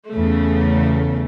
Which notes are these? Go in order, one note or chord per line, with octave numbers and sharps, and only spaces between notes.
E2 C#3 A3